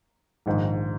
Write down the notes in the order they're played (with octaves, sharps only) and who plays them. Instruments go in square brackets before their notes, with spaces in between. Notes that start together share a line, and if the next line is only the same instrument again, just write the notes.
[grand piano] A#1 G#2 D#3